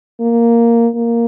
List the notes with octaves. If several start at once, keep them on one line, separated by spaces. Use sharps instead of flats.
A#3
A#3